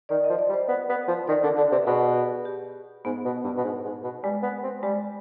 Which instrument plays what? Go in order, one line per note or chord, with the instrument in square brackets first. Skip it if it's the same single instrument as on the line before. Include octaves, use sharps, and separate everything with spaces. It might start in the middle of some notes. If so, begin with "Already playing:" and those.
[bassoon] D#3 [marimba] D5
[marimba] D#5
[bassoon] F3
[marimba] D5
[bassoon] G3
[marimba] C5
[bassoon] B3
B3
F3
[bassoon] D#3 [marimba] D5
[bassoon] D3 [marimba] D5
[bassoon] D3 [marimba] D5
[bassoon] C3 [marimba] B4
[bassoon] B2 [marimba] G#4
[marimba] G4
[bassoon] G#2 [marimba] B3
[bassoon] B2
G2
B2
G#2
G#2
B2
[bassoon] G3 [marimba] G#3
[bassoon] B3
C4
[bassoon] G3 [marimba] G#3